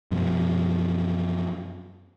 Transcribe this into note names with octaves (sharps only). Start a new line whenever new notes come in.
F#2 B2 F3